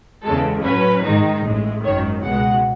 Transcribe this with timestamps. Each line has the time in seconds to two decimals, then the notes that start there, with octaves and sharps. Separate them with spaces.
0.24 E2 C#3 G#3 A4
0.64 A2 F#3 C#4 B4
1.05 G#2 D#3 G#3 D#4
1.45 A1 A2 G#3
1.84 G#1 F#2 D#3 C#5
2.24 C#2 B2 G#3 F#5